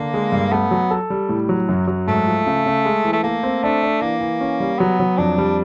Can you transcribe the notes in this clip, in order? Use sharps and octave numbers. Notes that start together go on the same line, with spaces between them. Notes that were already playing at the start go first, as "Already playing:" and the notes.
Already playing: D3 A#3
G#3
G2
A3 B3
F#3
A4
G3
A2
F#3
F#2
F#3
G#2 A3
F3
C#3
C#3
G#3
E3
A3
A3 A#3
C4
A3 D4
D4
E3 A#3
E3
C#4
G3
F#3 B3
F#3
F2 D4
G3